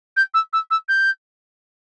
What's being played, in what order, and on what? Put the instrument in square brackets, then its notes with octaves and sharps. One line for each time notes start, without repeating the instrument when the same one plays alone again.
[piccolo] G6
E6
E6
E6
G6